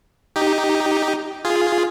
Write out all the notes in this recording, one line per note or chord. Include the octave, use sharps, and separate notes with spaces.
D#4 G4
F4 G#4